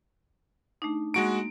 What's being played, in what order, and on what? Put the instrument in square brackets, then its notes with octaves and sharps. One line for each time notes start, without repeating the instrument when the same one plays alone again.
[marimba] A3 D4 D#4
[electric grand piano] G#3 F#4 D7 [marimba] A#3